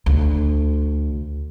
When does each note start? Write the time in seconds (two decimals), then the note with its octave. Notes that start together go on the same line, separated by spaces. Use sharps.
0.06 D2